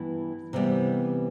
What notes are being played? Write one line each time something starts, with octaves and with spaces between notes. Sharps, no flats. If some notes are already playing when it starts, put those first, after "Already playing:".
Already playing: G2 E3 B3 E4
C3 E3 G3 B3